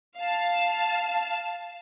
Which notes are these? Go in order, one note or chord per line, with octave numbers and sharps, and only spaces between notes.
F5 A5